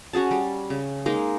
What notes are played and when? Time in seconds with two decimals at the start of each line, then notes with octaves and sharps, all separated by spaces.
0.13 C#4 F#4 G#4 A5
0.31 G3
0.70 C#3
1.06 G#3 A#3 D#4